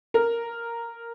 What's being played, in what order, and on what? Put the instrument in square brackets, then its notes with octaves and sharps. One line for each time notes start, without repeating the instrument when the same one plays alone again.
[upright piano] A#4